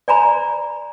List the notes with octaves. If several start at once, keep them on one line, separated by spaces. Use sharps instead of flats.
D5 G#5 A#5 B5